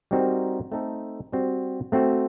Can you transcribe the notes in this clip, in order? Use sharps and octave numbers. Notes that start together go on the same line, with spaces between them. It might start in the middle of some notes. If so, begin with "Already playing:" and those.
G3 C4 D#4 F#4 A#4
A3 C4 D#4 A4
G3 C4 F#4
A3 C4 F#4